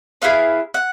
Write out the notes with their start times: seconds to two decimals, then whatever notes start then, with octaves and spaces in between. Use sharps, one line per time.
0.22 B3 E4 G#4 F5
0.74 F#5